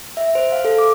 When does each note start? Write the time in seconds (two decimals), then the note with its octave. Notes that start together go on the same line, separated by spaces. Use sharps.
0.17 E5
0.35 C5
0.52 F5
0.65 A4
0.79 D6